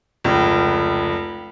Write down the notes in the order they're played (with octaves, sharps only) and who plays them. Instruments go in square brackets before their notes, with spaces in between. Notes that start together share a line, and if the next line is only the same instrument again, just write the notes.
[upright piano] F1 C#2